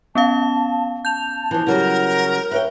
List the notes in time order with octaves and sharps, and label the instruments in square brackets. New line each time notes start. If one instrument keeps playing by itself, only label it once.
[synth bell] B3 C#4 F5 [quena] A5
[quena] A5 [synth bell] G6 F7
[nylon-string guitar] E3 F3
[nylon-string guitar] C#3 F#3 G3 [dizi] A#4 [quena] F#5
[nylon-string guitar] B4 C#5 G5 [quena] E5